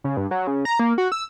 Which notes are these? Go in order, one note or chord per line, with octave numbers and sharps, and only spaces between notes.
C#3
G2
F#3
C#3
A#5
A#3
F#4
E6